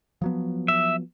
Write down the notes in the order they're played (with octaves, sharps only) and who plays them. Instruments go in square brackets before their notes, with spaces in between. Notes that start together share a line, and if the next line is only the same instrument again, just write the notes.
[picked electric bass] F3 F#3 B3
[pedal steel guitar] E5